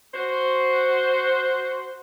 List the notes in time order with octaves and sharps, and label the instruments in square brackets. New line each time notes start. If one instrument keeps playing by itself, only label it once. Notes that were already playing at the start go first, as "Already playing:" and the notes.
[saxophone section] F#4 C5